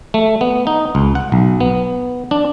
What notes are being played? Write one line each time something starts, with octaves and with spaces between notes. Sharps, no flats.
A3
B3
D#4
C#2
F#5
B1
B3
D4